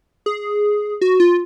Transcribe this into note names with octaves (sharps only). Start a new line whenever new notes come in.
G#4
F#4
F4